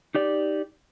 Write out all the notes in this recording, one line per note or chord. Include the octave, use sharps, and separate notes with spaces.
D#4 G4 D5